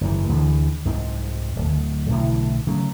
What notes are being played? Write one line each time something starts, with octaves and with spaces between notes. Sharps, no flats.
F#1 G#2 E3
D2 D3 E3 G#3
C2 G#2 F3 C4
D1
B1 A2 D3 E3
C#3 F#3 A3